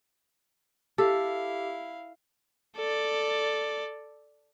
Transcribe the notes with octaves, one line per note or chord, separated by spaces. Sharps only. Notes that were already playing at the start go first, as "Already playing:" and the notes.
E4 G4 A4 F5
A4 D5